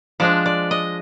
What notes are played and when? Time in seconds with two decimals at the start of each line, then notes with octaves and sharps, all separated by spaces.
0.20 F3 G#3 D4 D5
0.46 D5
0.71 D#5